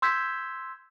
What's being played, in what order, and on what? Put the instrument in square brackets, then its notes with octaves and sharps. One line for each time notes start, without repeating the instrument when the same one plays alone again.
[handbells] C6 E6 G6 G#6 B6